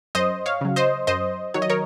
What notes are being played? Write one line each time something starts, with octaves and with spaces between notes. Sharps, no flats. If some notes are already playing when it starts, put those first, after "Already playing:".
F#2 C5 D#5
C#5 F5
C#3 F#3
C5 D#5
F#2 C5 D#5
D#3 F#3 C#5
D#5
A#4 C#5